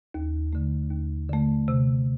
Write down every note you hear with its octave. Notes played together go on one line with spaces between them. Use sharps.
D#2
D3 A3
D#2
D3 A3
C3